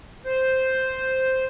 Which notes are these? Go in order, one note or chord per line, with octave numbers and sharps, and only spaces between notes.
C5